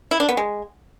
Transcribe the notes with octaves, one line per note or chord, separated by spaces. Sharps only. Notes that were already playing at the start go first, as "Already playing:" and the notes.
E4
D4
B3
G#3